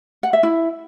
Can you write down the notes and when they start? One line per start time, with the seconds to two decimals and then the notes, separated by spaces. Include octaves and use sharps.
0.23 F#5
0.33 E5
0.43 E4